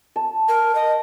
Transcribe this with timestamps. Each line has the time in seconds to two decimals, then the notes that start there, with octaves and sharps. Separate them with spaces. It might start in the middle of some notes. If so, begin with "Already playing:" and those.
0.16 A5
0.48 A#4
0.75 D#5